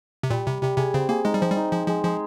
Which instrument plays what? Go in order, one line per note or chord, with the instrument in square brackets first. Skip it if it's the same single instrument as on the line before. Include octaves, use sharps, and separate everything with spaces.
[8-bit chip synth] C3
[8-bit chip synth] A#2 [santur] G3
[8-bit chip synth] C3 [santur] G3
[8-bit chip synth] C3 [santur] G3
[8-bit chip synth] C3 [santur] G#4
[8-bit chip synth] C#3 [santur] C4
[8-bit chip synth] A#3 [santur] G#4
[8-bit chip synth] G#3 [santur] D#4
[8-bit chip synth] G3
[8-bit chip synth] F3 [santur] C4
[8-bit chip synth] G3
[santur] D#4
[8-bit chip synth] F3 [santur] G#3
[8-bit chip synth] F3 [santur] G#3
[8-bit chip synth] F3 [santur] G#3